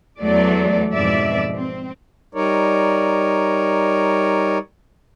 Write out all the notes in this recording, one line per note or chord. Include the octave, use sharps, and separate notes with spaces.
E2 F#3 A3 D5
F2 G#2 B2 D5 E5
C4
G3 D#4 A#4 C#5 D5